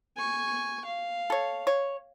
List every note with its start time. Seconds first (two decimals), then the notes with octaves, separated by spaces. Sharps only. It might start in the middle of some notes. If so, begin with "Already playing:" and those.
0.17 G#5 C#6
0.85 F5
1.30 A4 C#5
1.67 C#5